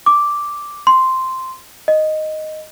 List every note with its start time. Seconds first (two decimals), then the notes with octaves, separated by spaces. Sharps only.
0.06 D6
0.87 C6
1.88 D#5